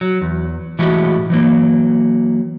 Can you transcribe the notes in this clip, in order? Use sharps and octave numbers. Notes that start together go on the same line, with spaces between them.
F#3
E2
A2 E3 G#3 E4 F#4 G4
E3 F#3 A#3